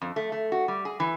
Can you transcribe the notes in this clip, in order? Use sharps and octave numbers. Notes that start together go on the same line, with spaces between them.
F2
A3
A3
F#4
G3
G#4
E3